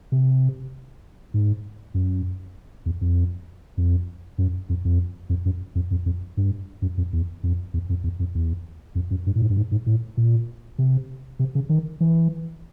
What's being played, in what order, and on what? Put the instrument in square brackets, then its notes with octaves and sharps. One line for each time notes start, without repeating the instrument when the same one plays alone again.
[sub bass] C3
G#2
F#2
E2
F2
F2
F#2
F2
F2
F2
F#2
F2
F2
F2
G2
F#2
F2
E2
F2
E2
F2
E2
F2
E2
F2
F#2
G2
A2
G#2
G2
G#2
G#2
A2
A#2
C3
C3
C#3
D#3
E3